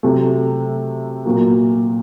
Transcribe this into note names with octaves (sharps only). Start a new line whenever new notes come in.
C3 F#3 A3
A#2 F#3 A#3